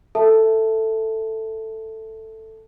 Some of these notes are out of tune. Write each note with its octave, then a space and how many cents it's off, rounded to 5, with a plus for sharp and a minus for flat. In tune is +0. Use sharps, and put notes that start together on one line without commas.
A4 +10 E5 +0 A5 +0